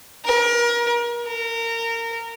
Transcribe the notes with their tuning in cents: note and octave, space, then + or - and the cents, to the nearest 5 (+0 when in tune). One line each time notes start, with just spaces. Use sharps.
A#4 +30
A#4 -20